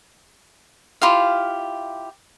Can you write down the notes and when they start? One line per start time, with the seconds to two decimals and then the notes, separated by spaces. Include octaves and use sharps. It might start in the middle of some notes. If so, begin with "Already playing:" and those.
1.02 E4 F4 G4 F5